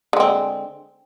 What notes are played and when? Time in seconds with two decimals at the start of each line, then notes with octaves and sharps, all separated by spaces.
0.13 D3
0.17 G#3
0.20 C4